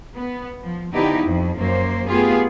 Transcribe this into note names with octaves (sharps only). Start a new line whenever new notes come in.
B3
F3
D3 F3 B3 D#4 E4 G4
F2 F3
F#2 A#3 C5
A3 B3 F4 G4 G#4